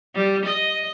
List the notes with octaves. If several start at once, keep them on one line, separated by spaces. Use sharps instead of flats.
G3
D#5